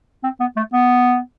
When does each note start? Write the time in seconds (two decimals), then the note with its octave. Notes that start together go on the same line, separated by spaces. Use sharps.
0.24 C4
0.40 B3
0.57 A3
0.73 B3